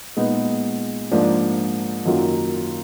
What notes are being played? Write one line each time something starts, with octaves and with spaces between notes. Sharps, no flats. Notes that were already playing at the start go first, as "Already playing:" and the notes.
A#2 G#3 B3 D#4
G#2 F3 A#3 D4
F#2 D#3 F#3 A#3 F4